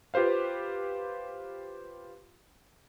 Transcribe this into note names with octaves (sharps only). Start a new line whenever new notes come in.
F4 G4 B4 C5 F5